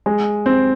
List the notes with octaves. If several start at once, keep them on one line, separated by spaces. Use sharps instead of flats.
G#3
C4